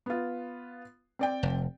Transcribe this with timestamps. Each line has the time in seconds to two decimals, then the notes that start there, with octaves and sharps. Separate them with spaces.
0.06 B3 F4
1.19 C4 D5 G5
1.43 F1